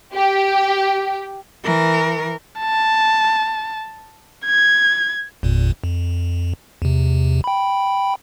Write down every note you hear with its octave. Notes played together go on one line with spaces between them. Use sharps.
G4
E3 A#4
A5
G#6
G1 E2 A#2
F2
E2 C3
G5 B5